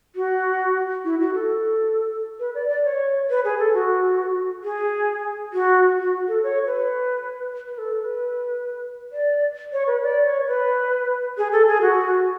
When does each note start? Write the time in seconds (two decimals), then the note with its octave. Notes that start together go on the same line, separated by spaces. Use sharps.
0.15 F#4
1.05 E4
1.20 F#4
1.34 A4
2.40 B4
2.55 D5
2.69 D5
2.84 C#5
3.30 B4
3.44 G#4
3.59 A4
3.74 F#4
4.64 G#4
5.53 F#4
5.99 F#4
6.28 A4
6.43 C#5
6.66 B4
7.68 B4
7.78 A4
8.01 B4
9.12 D5
9.73 C#5
9.87 B4
10.03 D5
10.25 C#5
10.48 B4
11.38 G#4
11.52 A4
11.67 G#4
11.81 F#4